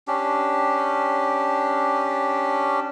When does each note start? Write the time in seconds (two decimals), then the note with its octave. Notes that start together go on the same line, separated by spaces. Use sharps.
0.08 C#4 D4 G4